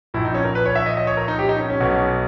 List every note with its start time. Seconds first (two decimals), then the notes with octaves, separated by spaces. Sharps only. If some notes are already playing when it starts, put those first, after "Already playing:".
0.14 A#1 E4
0.17 A#2
0.25 D#4
0.35 C#4
0.44 A#4
0.55 B4
0.66 C#5
0.76 E5
0.86 D#5
0.97 D#5
1.07 C#5
1.17 A#4
1.28 D#4
1.39 G4
1.49 D#4
1.59 C#4
1.70 C#4
1.80 B1 B2